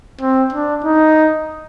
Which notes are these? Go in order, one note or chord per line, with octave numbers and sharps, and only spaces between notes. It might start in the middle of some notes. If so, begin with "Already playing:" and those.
C4
D4
D#4